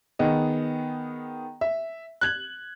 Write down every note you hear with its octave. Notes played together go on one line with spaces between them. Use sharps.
D#3 B3 G#4 D#5
E5
F#6 G#6 F#7